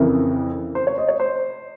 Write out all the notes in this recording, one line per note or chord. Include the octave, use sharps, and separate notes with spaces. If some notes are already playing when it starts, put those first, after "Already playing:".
Already playing: F2 C#3 E3 A#4
C5
C#5
D#5
C#5
C5